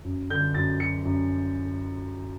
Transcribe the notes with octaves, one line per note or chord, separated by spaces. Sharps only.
F#2
D3 G6
F#2 A6
F#3 C#7
F#2